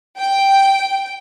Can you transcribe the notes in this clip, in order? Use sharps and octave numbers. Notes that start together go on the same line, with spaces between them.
G5